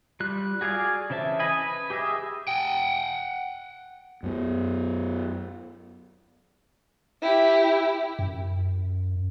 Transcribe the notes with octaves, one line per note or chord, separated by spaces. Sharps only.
G3 F4 F#6
F#4 G#4 D5 F5 G#5
C#3 E3 C5 E5 A5
D#5 G#5 B5
B4
G4 G#4 D#5 E5
F#5 G5
F#2 B3
E4 G4
F#2